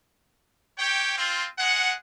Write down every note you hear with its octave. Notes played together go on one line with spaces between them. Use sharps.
G4 C#5 G5
C4 F4
G#3 F#5